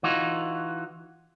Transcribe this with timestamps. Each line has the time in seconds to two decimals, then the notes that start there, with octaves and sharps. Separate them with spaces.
0.03 E3 D#4 F4 F#4